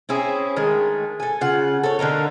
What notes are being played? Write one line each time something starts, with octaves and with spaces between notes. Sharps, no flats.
C4 C#4 E4 G#4
D#3 G#3 A3
A4 G#5
C#3 F4 F#5
A4 C#5
D3 A#3 D#4 A#4